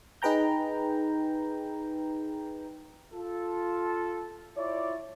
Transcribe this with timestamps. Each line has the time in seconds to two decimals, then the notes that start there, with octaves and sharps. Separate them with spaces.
0.22 D#4 G#4 B4 G5 A#5 G6
3.13 F4 A4
4.57 E4 F4 C#5 D5